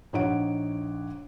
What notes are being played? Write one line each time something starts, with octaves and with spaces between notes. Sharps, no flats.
A#1 D#4 C#5 F#5 D7